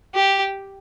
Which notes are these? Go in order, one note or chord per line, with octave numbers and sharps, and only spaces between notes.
G4